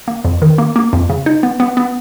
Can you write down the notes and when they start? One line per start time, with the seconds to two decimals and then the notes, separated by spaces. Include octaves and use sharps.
0.08 A#3
0.25 F2
0.42 D#3
0.58 A#3
0.76 A#3
0.93 F2
1.10 C#3
1.26 D#4
1.43 B3
1.60 B3
1.77 B3